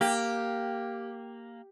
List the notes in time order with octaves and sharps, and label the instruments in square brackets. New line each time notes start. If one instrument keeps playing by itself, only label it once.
[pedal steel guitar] A#3 [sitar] G4